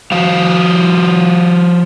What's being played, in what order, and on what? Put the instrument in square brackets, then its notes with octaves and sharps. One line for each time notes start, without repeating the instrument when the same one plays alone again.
[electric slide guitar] F3 F#4 F5